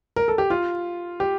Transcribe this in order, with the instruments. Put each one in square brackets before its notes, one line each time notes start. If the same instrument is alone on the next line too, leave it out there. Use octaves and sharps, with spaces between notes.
[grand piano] A#4
A4
G4
F4
G4